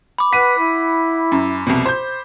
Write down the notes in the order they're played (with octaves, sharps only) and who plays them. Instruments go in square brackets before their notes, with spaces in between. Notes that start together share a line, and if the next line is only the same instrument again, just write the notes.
[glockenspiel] B5 D6
[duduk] B4 [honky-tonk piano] F#5 D#7 [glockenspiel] B6
[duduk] E4
[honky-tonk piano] F#2
C2 F2 B2
C5 G6